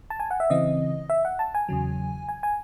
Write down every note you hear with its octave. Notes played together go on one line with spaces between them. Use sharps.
A5
G#5
F#5
E5
C#3 E3 C4 D#5
E5
F#5
A5
G#5
E2 C#3 F#3
G#5
G#5